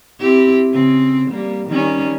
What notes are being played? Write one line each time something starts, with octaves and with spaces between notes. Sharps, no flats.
C4 E4 G4
C#3 C4
G3 A#3
D#3 G3 C#4